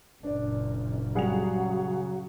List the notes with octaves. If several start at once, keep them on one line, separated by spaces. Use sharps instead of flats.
F#1 A#2 D4 D5
C#3 F#3 G3 G#4 F#5 F7